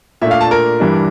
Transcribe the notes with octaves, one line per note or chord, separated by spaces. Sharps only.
A#2 A3 D4 E5
F5
A5
A#4
G2 E3 G3 D4